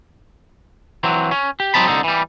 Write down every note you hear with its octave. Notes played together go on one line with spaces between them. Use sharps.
E3 F#3 C4
C#4
G4
F#3 C4 D#4 A5 B5
C2 G#2 D3 D#4 A4
E3 G3